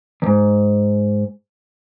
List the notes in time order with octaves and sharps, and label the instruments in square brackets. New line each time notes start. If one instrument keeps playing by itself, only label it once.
[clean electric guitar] E2 G#2